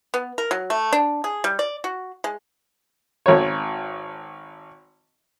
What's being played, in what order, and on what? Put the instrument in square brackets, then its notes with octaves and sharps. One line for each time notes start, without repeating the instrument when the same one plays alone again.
[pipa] B3
A#4
F#3
A3
D4
G#4
G3
D5
F#4
G#3
[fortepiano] G#1 C#5